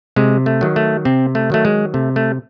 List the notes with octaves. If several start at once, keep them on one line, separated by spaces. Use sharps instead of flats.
C3 G#3
A3
D#3 F#3
A3
C3 C4
A3
D#3 F#3 A3
G#3
C3 A3
A3